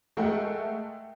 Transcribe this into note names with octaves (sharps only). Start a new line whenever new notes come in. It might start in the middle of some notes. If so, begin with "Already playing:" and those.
G#3 A3 A#4 E5 F#5 G5